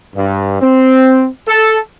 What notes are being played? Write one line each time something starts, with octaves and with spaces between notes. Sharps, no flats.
G2
C4
A4